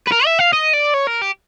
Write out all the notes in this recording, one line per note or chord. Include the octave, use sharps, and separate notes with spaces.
B4
A#4
E5
F5
D#5
D5
C#5
A#4
G4